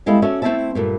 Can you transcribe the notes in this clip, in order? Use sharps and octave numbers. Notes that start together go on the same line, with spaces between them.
G3 G#3 C4 E4 A4 F5
C#4 F#4 A4 D5 E5
A3 C4 C#4 E4 E5 A5
G2 A#2 A3